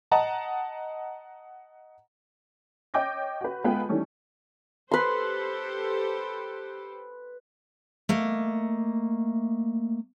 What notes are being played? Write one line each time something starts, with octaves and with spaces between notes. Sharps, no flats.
D#5 F#5 A5 A#5
C#5 D#5 G5 D6 G6 A#6
F#4 B4
G#3 B3 F4 A4 B4 G5
D#3 E3 G3 A3 C#4
G4 A4 B4 C5 C6
A3 A#3 D#5